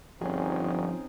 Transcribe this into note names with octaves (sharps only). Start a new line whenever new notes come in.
G1 F3 C4 C#4 D#4 G#4